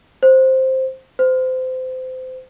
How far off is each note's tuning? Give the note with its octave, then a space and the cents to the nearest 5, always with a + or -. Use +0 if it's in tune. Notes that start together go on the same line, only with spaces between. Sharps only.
C5 +5
C5 -25